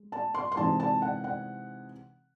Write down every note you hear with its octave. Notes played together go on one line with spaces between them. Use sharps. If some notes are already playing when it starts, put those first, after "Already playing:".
Already playing: G#3
A5
C6
C6
C3 E3 G#3 D#4 A5
A5
F#5
F#5